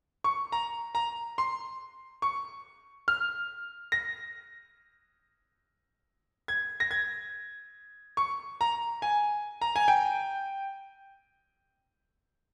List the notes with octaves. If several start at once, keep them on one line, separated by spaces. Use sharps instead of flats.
C#6
A#5
A#5
C6
C#6
F6
A#6
G#6
A#6
G#6
C#6
A#5
G#5
A#5
G#5
G5